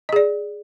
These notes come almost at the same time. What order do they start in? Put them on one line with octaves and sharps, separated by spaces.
D#5 G#4 D5